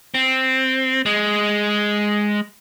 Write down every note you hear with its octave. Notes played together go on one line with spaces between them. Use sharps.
C4
G#3